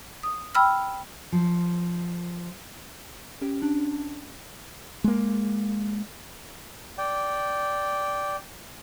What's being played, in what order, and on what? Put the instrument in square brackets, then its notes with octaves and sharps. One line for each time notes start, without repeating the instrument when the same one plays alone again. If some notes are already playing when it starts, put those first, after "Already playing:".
[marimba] D#6
G5 B5 E6 F6
[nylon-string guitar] F3
[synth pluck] C#4 G4
[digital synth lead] D4
[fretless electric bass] G#3 A#3
[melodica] D5 G5